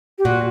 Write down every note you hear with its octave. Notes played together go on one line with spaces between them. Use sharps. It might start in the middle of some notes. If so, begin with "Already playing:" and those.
G4
A#2 F#4